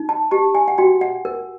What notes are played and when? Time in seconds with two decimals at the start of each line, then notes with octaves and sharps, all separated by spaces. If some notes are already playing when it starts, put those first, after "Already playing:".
Already playing: D#4
0.09 A5
0.31 G4 A5
0.55 G#5
0.68 F#5
0.78 F#4 G5
1.01 F#5
1.25 A#4